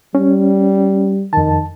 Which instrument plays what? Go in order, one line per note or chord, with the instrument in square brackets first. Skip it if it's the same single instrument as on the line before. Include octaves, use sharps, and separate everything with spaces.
[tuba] G3 [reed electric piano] C#4
[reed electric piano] F2 A5 [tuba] D#3